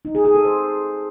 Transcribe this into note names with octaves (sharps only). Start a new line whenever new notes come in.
D#4
G#4
G#4
A4
C5